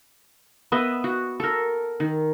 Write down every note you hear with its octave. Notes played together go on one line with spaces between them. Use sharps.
B3 B4 D#5 E5
F#4
A4 A#4
D#3